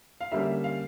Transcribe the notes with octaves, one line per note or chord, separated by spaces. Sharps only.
F5
D3 G3 A#3 C#4 E5
F5